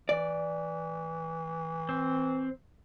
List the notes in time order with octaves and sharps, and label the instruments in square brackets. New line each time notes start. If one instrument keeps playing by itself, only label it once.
[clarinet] E3 [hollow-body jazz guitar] D5
[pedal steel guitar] C4